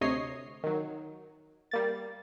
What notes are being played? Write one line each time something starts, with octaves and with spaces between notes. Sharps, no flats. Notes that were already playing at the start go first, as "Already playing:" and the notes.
D2 C3 C#5 D#5 C7
D#3 F#3
G3 A#3 A6